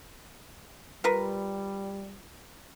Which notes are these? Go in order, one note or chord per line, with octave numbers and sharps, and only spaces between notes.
G3 F4 A#4 B4